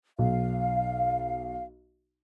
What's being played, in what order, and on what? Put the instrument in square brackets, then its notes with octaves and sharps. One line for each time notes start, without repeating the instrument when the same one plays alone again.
[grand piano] B1 [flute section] F5